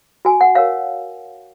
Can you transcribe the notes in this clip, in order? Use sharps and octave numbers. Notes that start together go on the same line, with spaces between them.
F#4 G#5
F#5
A#4 C#5 F5